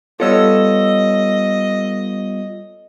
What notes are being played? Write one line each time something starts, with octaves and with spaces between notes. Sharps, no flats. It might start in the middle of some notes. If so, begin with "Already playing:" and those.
G3 B3 F4 A4 C#5 D#5 E6